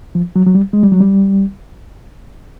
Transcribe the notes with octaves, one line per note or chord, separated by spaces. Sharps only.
F3
F#3
F#3
G3
G#3
G3
F#3
G3